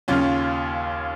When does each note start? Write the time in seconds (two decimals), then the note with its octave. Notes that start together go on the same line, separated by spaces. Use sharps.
0.08 D#2 C#3 C#4 F4